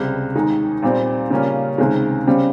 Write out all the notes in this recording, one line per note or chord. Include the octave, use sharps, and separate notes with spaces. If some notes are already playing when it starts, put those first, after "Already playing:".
Already playing: C#2 C3 G3
D#2 D#3 G#3 D#4
A#2 G3 C4
C#3 G3 A#3 C#4 F4
C#2 C3 D#3 G#3
C#3 G3 C4